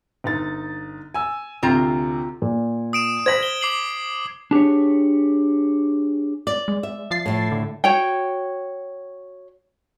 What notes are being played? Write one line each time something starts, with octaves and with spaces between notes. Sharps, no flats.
G1 D#4 A6
G#5 E6
D2 C3 C4 F4 A#5
A#2
D#6 D7 E7
C5 G#6 A#6 B6 F#7
G7
D6 C7 F#7
D4 G4 G#4 C#5
D5
G#3
E5
F3 A6 C7
A2 A3
D3
F#4 C#5 G5